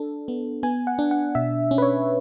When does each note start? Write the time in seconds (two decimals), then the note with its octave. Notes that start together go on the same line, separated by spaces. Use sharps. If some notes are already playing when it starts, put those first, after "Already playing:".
Already playing: D4 A4
0.28 B3
0.63 B3 G#5
0.87 F#5
0.99 D4
1.11 F#5
1.35 B2 E5
1.71 C#4
1.78 B4
1.82 C#5